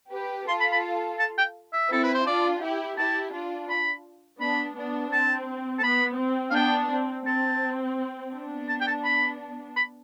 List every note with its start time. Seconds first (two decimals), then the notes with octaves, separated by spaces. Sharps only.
0.12 G4 B4
0.48 F4 A4 C6
0.60 B5
0.72 B5
1.19 A5
1.38 G5
1.73 E5
1.90 C4 E4 A4
2.03 B4
2.14 C5
2.26 D4 F4 D5
2.62 E4 G4
2.97 E4 G4 A5
3.33 D4 F4
3.70 B5
4.40 B3 D4 B5
4.76 B3 D4
5.12 C4 A5
5.79 A5
5.83 B3 B5
6.19 C4
6.50 F5
6.55 B3 D4 G5
6.91 C4
7.27 C4 A5
8.33 B3 D4
8.69 A5
8.81 G5
8.87 A5
9.04 B5
9.76 B5